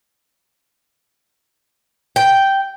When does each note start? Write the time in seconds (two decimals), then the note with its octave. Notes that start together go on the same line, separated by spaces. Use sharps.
2.16 G5